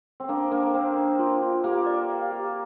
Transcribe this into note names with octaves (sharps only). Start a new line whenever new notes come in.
C4
A#3 D4
A#3 D4
C4 D4
D4
F4
F4
A#3 G4
D5
F5
G4